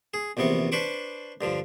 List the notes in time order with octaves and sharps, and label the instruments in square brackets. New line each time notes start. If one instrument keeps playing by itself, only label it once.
[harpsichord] G#4
A#1 E2 C3 B3 C#6
D4 B4 C5 B5 C#6 D6
G2 D3 F3